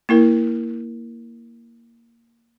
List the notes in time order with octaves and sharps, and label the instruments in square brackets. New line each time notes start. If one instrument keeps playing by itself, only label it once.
[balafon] A#3 E4 A#4